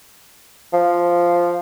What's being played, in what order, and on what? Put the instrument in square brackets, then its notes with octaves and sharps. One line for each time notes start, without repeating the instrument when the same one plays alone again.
[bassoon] F3